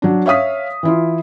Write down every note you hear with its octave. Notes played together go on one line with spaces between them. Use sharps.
F#3 D4
C#5 E5 F5 D#6 B6
E3 E4 F4